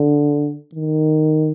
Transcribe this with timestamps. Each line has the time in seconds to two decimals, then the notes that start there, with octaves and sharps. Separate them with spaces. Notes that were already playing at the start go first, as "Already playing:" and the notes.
Already playing: D3
0.74 D#3